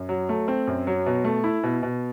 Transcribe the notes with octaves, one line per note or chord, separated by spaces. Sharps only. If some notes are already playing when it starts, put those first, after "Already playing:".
Already playing: F#2
F#3
A3
C4
F#2
F#3
B2
A3
E4
B2
B2